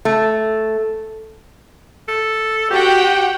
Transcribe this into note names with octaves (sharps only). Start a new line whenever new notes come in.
A3
A4
F#4 G4 F#5 G5